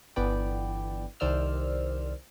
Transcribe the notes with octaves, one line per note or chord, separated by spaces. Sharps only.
G1 E3 B3 B4 D5 G5
C2 D#3 C5 D5 E6 F6